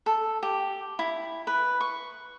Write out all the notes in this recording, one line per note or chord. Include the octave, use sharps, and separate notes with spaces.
A4
G4
E4
B4
C#6